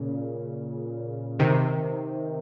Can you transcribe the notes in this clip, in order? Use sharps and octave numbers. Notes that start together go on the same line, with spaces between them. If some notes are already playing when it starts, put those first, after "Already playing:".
Already playing: A#2 C#3
C3 D#3